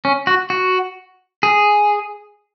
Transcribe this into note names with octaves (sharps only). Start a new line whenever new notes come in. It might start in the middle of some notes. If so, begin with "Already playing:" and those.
C#4
F#4
F#4
G#4